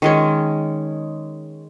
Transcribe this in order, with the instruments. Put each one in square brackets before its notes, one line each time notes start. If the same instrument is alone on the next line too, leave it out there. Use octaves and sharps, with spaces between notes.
[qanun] D#3 G#3 C#4